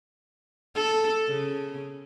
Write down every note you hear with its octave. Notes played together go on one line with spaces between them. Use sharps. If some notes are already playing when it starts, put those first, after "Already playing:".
A4
C#3